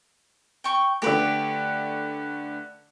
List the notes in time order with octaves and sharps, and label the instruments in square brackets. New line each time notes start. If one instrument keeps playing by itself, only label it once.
[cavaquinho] G5 C#6
[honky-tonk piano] D3 A3 [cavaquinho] G4 B4